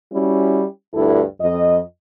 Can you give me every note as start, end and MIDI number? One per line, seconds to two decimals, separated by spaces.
0.13 0.64 55
0.13 0.64 61
0.13 0.64 64
0.13 0.64 66
0.94 1.22 38
0.94 1.22 43
0.94 1.22 64
0.94 1.22 69
1.40 1.79 41
1.40 1.79 75